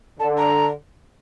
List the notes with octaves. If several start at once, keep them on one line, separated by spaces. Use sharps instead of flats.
D3 A5
A#5